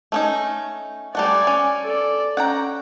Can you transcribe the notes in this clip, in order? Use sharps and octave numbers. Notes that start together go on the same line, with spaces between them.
A3 C#4 D#4
G3 A3 F#4 D5 G#5
C#4
A4 D5
C#4 F#5 G5 A#5